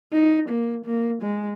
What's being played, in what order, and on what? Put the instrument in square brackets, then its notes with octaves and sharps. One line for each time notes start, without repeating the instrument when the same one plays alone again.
[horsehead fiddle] D#4
A#3
A#3
G#3